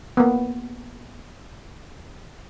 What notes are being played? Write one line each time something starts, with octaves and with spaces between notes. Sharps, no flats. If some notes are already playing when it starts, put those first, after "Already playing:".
A#3 B3